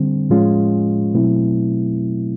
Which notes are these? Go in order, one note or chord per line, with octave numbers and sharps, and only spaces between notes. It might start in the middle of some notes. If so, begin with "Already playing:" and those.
Already playing: D3 G3 C4
A2 F3 G#3 C#4 F4
B2 F#3 A3 C4 E4